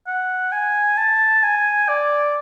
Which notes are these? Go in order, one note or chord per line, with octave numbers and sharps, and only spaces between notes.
F#5
G#5
A5
G#5
D5